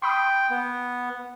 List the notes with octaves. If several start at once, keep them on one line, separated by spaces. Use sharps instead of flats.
G5 B5 C6 D#6
B3